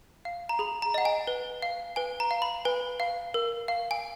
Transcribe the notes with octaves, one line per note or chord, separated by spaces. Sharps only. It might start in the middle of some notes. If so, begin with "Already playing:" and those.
F5
A#5
G#4 B5
A#5
D#5 F#5
G#5
B4
F5
B4 G#5
A#5
F5
B5
B4 G#5
F5
A#4
F5
G#5